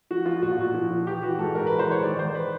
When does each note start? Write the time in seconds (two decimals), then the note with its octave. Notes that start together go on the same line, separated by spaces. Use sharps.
0.11 F3 F#4
0.25 F3 F4
0.42 A#2 F#4
0.51 F4
0.59 A#2 F#4
0.74 F3
0.91 F3
1.07 E3 G4
1.23 E3 F#4
1.39 G#2 A4
1.54 G#2 A#4
1.67 E3 B4
1.79 C5
1.87 E3 C#5
2.03 D#3 D5
2.18 D#3 C5
2.35 B4